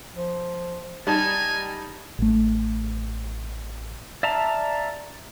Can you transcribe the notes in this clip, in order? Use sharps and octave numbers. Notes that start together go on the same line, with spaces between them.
F3
G3 D#4 G#5 A5
A1 A3
D5 E5 F5 A5 A#5